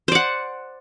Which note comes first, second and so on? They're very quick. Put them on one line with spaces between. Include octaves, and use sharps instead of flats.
C5 D5 F#5